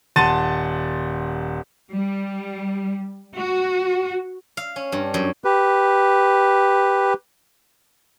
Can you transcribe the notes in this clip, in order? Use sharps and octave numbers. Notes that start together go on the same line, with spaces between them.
D#1 F#5 A5 C6 A6 D#7
G3
F#4
F5
C#4
G2
F#2
G4 B4